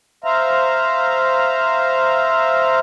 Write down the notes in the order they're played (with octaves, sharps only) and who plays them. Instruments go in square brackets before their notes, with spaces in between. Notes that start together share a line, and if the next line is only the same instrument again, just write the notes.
[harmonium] C5 E5 F5 A#5